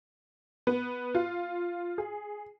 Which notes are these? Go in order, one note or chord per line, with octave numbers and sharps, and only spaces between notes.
B3
F4
G#4